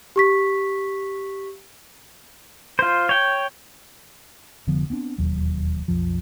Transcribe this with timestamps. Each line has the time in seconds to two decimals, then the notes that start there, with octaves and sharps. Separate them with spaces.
0.16 G4 C#6 B6
2.79 F4 C5
3.09 C#5 G5
4.67 F1 D3 F3 B3
4.90 B3 C4 D4
5.18 E1 D#2 F#3
5.88 B1 F2 F3